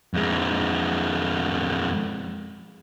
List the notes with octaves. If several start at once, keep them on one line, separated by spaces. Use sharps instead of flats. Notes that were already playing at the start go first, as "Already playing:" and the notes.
F2 G#3